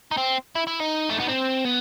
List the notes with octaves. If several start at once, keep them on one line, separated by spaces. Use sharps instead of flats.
D#4
C4
E4
E4
D#4
A3
B3
C4
B3